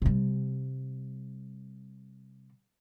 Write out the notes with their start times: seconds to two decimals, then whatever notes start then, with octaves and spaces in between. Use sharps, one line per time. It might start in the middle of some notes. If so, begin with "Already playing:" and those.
0.02 C3 G3